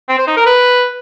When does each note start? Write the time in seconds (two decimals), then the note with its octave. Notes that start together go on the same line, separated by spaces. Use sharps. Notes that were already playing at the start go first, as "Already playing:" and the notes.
0.08 C4
0.18 C5
0.27 D#4
0.36 A#4
0.46 B4